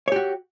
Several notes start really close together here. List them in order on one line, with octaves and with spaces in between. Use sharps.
C#5 G4 F#4